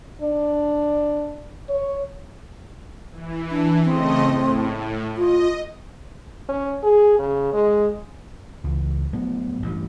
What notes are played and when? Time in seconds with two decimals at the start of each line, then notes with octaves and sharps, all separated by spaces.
0.21 D4
1.69 C#5
3.12 E3
3.51 D4
3.85 C#3 A3 C4 D#5
4.24 A2
5.17 F4 D#5
6.49 C#4
6.83 G#4
7.19 C#3
7.53 G#3
8.64 C#2 E3
9.13 A2 F#3 B3
9.62 A1 G2